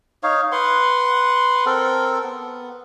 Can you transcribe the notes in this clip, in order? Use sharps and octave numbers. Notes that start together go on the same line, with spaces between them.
D#4 C#5 F5
B4 F#5 C6
C4 A4 A#4
B3